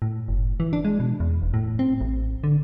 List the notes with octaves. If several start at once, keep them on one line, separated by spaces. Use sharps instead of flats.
A2
F#1
E3
D4
G#3
B2
E2
E1
A2
C4
A1
D3